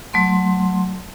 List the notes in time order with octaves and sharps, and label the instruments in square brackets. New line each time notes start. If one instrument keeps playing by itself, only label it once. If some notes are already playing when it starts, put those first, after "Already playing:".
[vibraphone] F#3 A3 C6